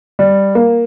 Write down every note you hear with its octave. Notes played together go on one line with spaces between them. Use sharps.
G3
A#3